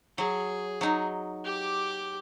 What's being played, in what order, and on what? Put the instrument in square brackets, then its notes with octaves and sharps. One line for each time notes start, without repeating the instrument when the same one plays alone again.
[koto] F#3 [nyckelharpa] G#4
[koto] F#3 D#4
[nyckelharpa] G4 D6